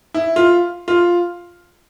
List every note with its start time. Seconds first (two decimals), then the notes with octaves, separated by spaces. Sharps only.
0.14 E4
0.36 F4
0.88 F4